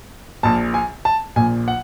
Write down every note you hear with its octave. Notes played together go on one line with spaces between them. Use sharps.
A#1 A#2 A5
G#5
A5
A#1 A#2 G#5
F#5